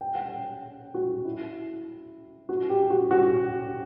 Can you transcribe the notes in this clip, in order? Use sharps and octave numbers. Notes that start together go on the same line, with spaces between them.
G5
F#5
G5
F#4
E4
F#4
G4
F#4
F#4